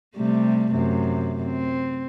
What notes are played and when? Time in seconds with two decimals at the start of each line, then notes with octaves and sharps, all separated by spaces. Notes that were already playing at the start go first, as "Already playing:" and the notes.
0.16 C3 G3 A3
0.72 F#2 C3
1.44 C4